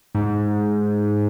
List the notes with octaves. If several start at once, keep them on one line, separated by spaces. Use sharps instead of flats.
G#2